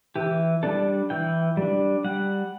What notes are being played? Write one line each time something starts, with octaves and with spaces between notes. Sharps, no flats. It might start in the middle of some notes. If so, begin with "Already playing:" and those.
E3 G4
G3 D4 A4
E3 G5
G3 D4
G3 F#5